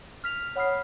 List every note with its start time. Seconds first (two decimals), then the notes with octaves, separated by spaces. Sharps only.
0.24 F6 B6 F7
0.56 C#5 F#5 B5 D#6 F6 C7